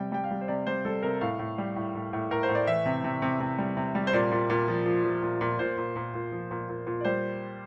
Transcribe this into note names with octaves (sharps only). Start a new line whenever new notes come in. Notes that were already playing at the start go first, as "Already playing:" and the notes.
Already playing: C3 G3 G5
G3 G5
F5
G3
C5
C3 D5
G3 C5
G3 A4
C3 A#4
A2 F5
A2
G3
A2
A2
A2
A2 A#4
C5
A2
D5
E3 E5
C3
C3
C3
C3
G3
C3
G3
C5
A#2 D5
A#2
A#2
F3
F3
F3
A#2
A#2
A#2 C5
A#2
A#2
A#2
F3
A#2
A#2
A#2
D5
G3 C5